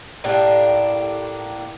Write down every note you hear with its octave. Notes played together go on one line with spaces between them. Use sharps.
A2 A#3 D4 G4